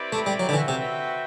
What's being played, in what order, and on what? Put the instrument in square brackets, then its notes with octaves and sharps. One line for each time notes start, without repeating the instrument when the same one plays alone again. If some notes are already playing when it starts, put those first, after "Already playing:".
Already playing: [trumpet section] C4 E4 G4 B4 D5
[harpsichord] A3
G3
F#3
D3
[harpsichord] E3 [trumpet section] C4 F#4 B4 E5 G5
[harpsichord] C3